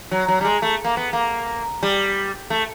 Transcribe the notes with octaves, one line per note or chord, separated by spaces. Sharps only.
F#3
F#3
G3
G#3
A3
A#3
B3
A#3
G3
A3